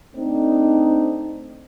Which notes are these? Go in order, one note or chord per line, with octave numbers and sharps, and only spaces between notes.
A3 C4 D4 D#4